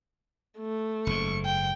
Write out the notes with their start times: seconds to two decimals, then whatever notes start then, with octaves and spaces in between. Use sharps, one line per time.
0.59 A3
1.07 F#1 G#2 C#6
1.45 G5